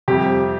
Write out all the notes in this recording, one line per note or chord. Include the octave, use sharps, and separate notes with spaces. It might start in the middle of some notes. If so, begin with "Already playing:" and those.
F2 C3 G3 G4